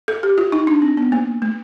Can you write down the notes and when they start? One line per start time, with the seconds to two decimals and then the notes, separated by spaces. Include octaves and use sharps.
0.08 A4
0.23 G4
0.38 F4
0.52 D#4
0.67 D4
0.82 C4
0.97 B3
1.12 A#3
1.42 A3